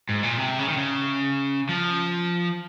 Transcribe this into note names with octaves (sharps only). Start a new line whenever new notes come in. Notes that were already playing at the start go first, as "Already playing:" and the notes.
G#2
A#2
C3
C#3
D#3
C#3
F3